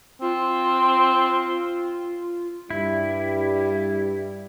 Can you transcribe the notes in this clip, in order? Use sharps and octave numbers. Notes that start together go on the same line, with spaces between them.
C4 F4
G2 G3 E4